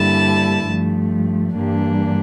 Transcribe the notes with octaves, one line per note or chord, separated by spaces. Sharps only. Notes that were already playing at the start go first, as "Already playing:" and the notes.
Already playing: G2 D3 G3 A#3 E4 A5
G2 F3 A3
G2 E3 G3 A#3 D4